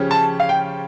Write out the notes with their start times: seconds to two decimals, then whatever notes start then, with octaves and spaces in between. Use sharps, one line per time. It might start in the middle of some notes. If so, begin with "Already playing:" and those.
Already playing: C#3 F3 C#4 G4 C#5
0.11 A5
0.40 F5
0.49 G5